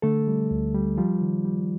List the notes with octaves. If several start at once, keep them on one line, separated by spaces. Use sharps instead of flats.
D3 A3 A4
G3
D2
G3
F3 G3 F4
D#3
G3